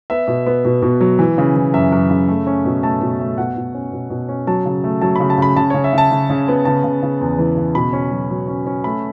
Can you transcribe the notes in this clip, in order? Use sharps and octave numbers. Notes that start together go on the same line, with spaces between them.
B3 E5
B2
B3
B2
B2
F#3
E3
C#3
E3
F#2 E5
F#2
C#3
A3
C#4
B2
A3 A5
B2
A3
B2 F#5
B2
C#4
B2
B2
C#4
F#3 A5
C#3
A3
F#3 A5
C#3 B5
A5
C#3 B5
C#3 A5
C#3 C#5
E5
C#3 A5
C#3
C#3
B3
C#3 A5
C#3
C#3
E2
E3
C#3
B2 B5
C#4
F#3
F#3
C#4
C#4
A3 B5